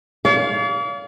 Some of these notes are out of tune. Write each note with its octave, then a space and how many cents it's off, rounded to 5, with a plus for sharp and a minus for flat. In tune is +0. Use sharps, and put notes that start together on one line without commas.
D5 -45 F5 +0